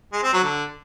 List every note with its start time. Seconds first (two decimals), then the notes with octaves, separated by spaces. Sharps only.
0.13 G#3
0.23 C4
0.33 F#3
0.43 D3